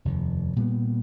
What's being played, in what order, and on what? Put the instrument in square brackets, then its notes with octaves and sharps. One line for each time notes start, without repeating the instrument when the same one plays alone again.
[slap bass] F1 D#2
A#2 G3 B3